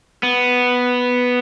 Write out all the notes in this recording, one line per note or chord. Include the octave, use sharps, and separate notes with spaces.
B3